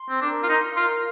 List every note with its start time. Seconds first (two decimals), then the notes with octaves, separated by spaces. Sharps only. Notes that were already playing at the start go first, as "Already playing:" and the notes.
Already playing: C6
0.09 C4
0.21 D4 A#4
0.43 F4
0.49 D#4 C6
0.76 F4 A#4